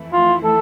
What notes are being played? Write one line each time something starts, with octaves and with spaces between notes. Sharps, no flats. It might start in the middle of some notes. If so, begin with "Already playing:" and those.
Already playing: F2 E3 A3 E4
F4
A4